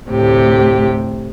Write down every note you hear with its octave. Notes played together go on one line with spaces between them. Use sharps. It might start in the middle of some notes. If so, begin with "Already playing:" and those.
D2 A2 C3 G4